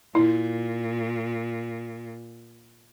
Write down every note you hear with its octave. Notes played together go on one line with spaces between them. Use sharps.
A#2 E4